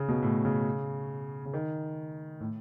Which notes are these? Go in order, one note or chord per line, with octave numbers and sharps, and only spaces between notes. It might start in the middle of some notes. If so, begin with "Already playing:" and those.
Already playing: C#3
B2
A2
C#3
C#3
D#3
A2